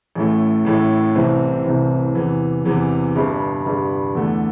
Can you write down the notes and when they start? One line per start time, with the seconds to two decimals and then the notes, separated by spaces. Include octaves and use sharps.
0.15 A1 A2 A3
0.65 A1 A2 A3
1.16 C2 C3 E3 C4
1.66 C2 C3 E3 C4
2.15 E2 C3 E3
2.65 E2 C3 E3
3.16 G1 G2 G3
3.65 G1 G2 G3
4.15 E2 D3 A3